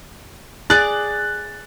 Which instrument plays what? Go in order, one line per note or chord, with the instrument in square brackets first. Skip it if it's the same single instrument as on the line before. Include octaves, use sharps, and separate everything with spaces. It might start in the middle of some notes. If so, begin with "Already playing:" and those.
[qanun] G#4 D5 [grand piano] F#6 A6